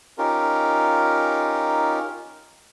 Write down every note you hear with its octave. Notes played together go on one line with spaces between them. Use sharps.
C#4 D#4 F4 G4 A#4